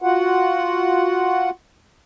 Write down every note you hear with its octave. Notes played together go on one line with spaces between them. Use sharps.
F4 F#4 F#5